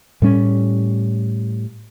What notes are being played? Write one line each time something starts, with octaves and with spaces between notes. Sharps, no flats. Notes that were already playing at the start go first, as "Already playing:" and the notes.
A2 G3 C#4